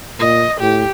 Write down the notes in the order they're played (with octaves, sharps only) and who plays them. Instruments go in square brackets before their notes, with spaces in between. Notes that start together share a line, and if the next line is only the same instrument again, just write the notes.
[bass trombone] A#2 [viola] D#5
[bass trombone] A2 [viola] G4